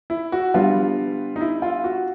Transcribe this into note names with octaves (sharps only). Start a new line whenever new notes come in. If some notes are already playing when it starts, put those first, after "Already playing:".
E4
F#4
D3 G3 B3 F4
D#4
E4
F4
F#4